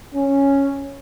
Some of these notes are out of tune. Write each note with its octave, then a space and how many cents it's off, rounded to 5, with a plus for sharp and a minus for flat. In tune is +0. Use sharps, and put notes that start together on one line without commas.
C#4 -5